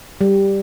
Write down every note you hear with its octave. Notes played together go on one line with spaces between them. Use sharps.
G3